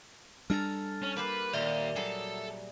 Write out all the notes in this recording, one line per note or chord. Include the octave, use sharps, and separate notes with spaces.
G3 D4 A4 G#5 A#5 F6 A6
C#4
A#3 G4 B4 C5
D#2 A#2 D5 E5
F#3 G3 G#4 A4